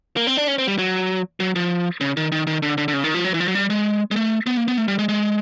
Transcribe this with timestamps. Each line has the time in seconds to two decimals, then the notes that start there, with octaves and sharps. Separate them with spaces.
0.17 A#3
0.27 C4
0.37 D4
0.48 C#4
0.58 C4
0.68 G3
0.78 F#3
1.40 F#3
1.56 F3
2.01 C#3
2.17 D#3
2.32 D#3
2.47 D#3
2.62 D3
2.78 D3
2.88 D3
2.93 C#3
3.04 D#3
3.14 F3
3.24 F#3
3.34 E3
3.40 F3
3.48 F#3
3.55 G3
3.70 G#3
4.11 G#3
4.16 A3
4.46 B3
4.57 A#3
4.68 B3
4.78 A3
4.88 G3
4.99 G#3
5.09 G#3